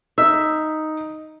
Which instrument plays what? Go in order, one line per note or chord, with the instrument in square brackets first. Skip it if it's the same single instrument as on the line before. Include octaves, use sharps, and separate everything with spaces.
[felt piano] D#4 [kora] E5